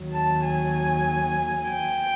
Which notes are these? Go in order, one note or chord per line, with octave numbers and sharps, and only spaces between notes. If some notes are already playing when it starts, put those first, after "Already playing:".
Already playing: D#2 D#3 F#3
A5
G#5
G5